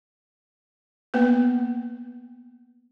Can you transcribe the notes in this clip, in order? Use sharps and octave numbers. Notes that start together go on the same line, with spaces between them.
A#3 B3 B4